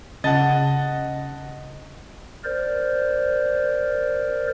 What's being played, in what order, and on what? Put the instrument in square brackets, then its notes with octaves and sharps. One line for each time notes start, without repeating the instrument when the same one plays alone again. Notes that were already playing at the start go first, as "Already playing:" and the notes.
[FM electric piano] C#3 [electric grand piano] D#5 F#5 [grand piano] A5 A6
[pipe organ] A#4 C5 D5